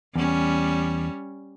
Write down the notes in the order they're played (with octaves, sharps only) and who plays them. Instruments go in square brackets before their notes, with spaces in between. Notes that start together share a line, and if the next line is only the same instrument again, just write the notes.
[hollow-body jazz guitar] E2 [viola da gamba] G3 C#4